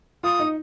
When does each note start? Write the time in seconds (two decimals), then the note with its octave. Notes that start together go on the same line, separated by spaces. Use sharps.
0.23 F4 D#6
0.40 D#4